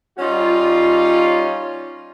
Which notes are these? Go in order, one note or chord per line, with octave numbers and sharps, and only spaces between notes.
G3 C#4 D#4 F4